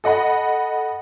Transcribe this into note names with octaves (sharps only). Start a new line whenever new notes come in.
A4 D#5 F#5 B5